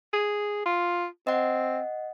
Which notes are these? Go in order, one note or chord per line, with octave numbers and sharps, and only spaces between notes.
G#4
F4
C4 D#5 F#5